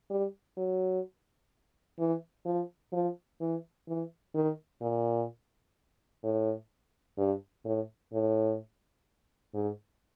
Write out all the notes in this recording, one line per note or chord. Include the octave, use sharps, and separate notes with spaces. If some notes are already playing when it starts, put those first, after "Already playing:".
G3
F#3
E3
F3
F3
E3
E3
D#3
A#2
A2
G2
A2
A2
G#2